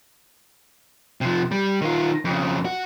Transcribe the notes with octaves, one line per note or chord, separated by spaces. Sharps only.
C3 F3
G3
D#3 F4
F2 C#3
F#4